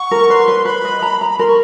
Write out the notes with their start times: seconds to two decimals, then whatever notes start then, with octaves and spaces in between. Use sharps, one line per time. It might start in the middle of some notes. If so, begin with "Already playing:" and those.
Already playing: F#5 C#6
0.11 A#4
0.30 B4 C6
0.48 B4
0.65 B4 B5
0.85 D#5
1.02 A#5
1.21 A#5
1.31 B5
1.39 A#4 C6
1.48 C#6